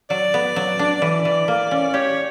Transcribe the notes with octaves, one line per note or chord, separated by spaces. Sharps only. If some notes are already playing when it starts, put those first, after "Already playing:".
F#3 D5
B3
F#3
D4
E3 D5
E3
A#3
C#4
G4 C#5